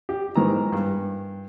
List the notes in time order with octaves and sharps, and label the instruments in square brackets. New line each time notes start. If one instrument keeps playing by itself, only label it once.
[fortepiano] G4
G#2 D#3 E3 A#5
G2